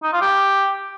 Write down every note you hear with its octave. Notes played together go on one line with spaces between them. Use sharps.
D#4
F4
G4